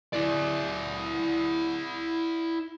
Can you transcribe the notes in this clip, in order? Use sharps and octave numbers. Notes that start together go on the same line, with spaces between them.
E4 D5